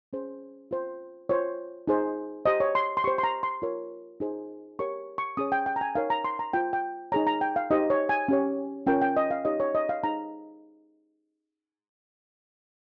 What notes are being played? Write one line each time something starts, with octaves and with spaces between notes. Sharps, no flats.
C#4 G#4 C5
F4 C5
F4 C5 C#5
D#4 G#4 C5
G4 C5 D#5
C#5
C6
C6
G4 C5 C#6
C6
A#5
C6
F4 A#4 C#5
D#4 G#4 C5
G4 A#4 C#5 C#6
C#6
C#4 G#4 C#5 D#6
G5
G5
A#5
G#5
D#4 A#4 C#5 F5
A#5
C6
A#5
F4 C5 G5
G5
D#4 G#4 C#5 A#5
A#5
G5
F5
D#4 G4 C5 D#5
C#5
G#5
C#4 G4 C#5
C#4 F4 A#4 C#5 G5
G5
D#5
F5
D#4 G4 C#5 D#5
C#5
D#5
F5
D#4 G#4 C5 A#5